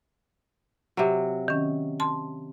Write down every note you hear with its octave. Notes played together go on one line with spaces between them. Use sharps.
C3 F#3
D#3 C#4
A5 C6